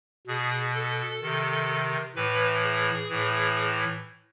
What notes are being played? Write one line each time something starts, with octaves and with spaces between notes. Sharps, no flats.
B2 G#4
A4
C3 D#3
A2 E3 B4
G#4
A2 E3